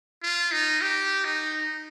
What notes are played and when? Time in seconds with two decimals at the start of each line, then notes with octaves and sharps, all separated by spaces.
0.23 F4
0.52 D#4
0.82 G4
1.25 D#4